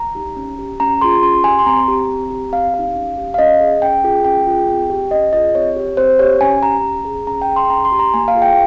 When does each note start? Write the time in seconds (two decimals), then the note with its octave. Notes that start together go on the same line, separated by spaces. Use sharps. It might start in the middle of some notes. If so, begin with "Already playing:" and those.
Already playing: A#5
0.15 D#4 G4
0.37 C#4
0.59 G4
0.80 C#4 A#5
1.01 F4 G#4 C6
1.23 C#4 C6
1.44 G4 G#5
1.59 C6
1.66 C4 A#5
1.88 G4
2.09 C4
2.30 G4
2.52 C4 F5
2.74 D#4 G4 F5
2.95 C#4
3.18 G4
3.34 F5
3.38 C#4 D#5
3.60 G#4
3.82 C#4 G5
4.04 F4 G#4
4.25 C#4 G5
4.47 F4 G#4
4.68 C4
4.90 G4
5.11 C#4 D#5
5.33 F4 G#4 D#5
5.55 C4 C#5
5.76 G4
5.97 C4 C5
6.19 G4 C#5
6.41 C#4 G#5
6.62 G4 A#5
6.84 C#4
7.05 G#4
7.27 C#4 A#5
7.42 G5
7.49 G#4
7.56 C6
7.70 C#4 A#5
7.85 C6
7.92 G4
7.99 A#5
8.14 A#3 G#5
8.28 F5
8.35 F4 G#4
8.42 G5